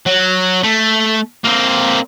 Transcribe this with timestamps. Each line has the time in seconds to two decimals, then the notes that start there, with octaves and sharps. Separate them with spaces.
0.06 F#3
0.64 A3
1.44 A#3 C4